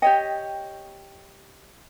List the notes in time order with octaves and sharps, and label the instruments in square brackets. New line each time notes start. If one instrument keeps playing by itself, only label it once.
[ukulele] G4 C#5 D#5 [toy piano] G5